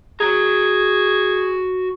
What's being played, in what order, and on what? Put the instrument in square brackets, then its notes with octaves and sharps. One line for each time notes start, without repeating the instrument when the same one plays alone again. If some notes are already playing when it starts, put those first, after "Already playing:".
[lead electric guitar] F#4 A#5 [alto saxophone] G#4